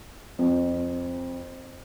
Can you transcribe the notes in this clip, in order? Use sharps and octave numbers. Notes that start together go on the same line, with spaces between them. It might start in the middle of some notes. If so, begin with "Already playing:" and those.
F2